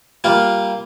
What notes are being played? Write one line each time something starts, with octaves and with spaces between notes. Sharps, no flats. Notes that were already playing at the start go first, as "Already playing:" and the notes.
G3 A#3 F4